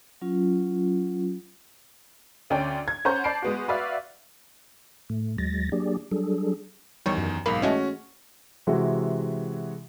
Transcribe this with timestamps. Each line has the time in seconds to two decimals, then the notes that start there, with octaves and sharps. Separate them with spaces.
0.21 F#3 C#4 F4
2.50 D2 C#4 D5 G5
2.88 G#6
3.05 C#4 C5 F#5 A#5 C#6 G6
3.24 D5 A5 B5 C7 D7
3.42 G#3 B3 F#4
3.68 F#4 B4 D5 E5 F5
5.09 A2 A3
5.38 D#2 F#3 G#3 A6 A#6
5.72 F#3 A#3 D4 G4 G#4 D5
6.11 F#3 G3 D4 G#4 A4
7.06 E2 D#3 G3 C#5
7.18 F#2
7.46 B1 G#2 A#3 B5
7.62 E3 G#3 A3 C#4 F#4
8.67 C3 E3 G#3 F#4